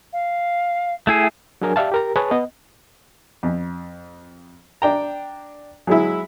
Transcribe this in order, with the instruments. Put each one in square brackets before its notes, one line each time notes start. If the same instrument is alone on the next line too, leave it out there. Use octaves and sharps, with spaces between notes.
[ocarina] F5
[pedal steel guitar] A3 E4 G#4 [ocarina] G5
[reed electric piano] F#3 D4 G#4 A#4 G#5
G4 D5 E5 F5 A5
G4 A#4 A#5
G#4 B4 C#5 A5
B3 D#5
[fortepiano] F2
D4 G5 A#5
F#3 G#3 E4